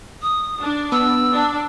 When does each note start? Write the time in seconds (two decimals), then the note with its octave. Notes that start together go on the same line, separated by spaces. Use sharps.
0.22 D#6
0.62 D4
0.92 B3 E6
1.32 D4